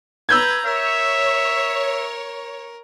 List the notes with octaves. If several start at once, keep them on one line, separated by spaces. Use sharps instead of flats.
B4 A#5 E6 G6 G#6
A#4 C#5 E5